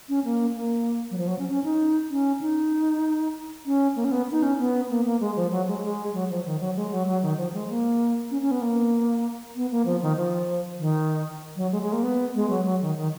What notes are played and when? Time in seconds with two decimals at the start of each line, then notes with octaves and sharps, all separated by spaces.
0.09 C#4
0.25 A#3
0.56 A#3
1.11 F#3
1.18 F3
1.28 F#3
1.39 C#4
1.49 C#4
1.64 D#4
2.11 C#4
2.41 D#4
3.66 C#4
3.96 A#3
4.05 C#4
4.11 B3
4.31 D#4
4.43 C#4
4.59 B3
4.90 A#3
5.05 A#3
5.20 G#3
5.36 F3
5.51 F#3
5.67 G#3
5.83 G#3
6.14 F#3
6.30 F3
6.45 D#3
6.60 F#3
6.76 G#3
6.92 F#3
7.07 F#3
7.22 D#3
7.38 F3
7.53 G#3
7.70 A#3
8.31 C#4
8.42 C#4
8.51 B3
8.62 A#3
9.56 B3
9.71 A#3
9.86 F3
10.02 D#3
10.17 F3
10.79 D#3
11.56 F#3
11.72 G#3
11.82 G#3
11.93 A#3
12.03 B3
12.35 G#3
12.50 F#3
12.65 F#3
12.81 D#3
12.96 D#3